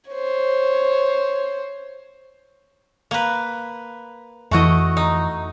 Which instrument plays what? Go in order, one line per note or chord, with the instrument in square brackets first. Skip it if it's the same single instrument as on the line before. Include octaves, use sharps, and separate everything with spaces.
[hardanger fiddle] C5 C#5
[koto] A#3 B4
[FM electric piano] F2 E3 [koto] A3 F#4 D#5
[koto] D#4